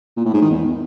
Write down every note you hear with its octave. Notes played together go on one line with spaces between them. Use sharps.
A#2
A2
G#2
D#3
E2